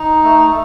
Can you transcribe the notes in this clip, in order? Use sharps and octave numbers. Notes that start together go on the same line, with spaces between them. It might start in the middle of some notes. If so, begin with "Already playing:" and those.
Already playing: D#4
A3